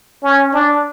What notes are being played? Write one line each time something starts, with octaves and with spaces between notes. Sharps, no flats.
C#4
D4